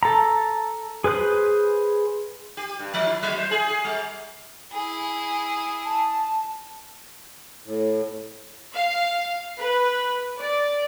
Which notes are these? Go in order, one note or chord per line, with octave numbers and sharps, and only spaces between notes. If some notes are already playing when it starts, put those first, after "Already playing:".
A4 A#5
G#4 B4 C5 F#6
G4
G2
F3
E4
F#3
C5
G#4
G#4
G3
E4 G#4
A5
A2
F5
B4
D5